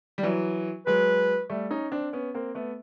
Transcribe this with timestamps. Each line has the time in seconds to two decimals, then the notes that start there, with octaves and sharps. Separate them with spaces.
0.18 G3
0.23 E3 F#3
0.86 F#3 G#3 B4
1.50 G3 A3
1.71 C#4 D#4
1.92 C4 D4
2.13 B3 C#4
2.34 A#3 C4
2.55 A3 B3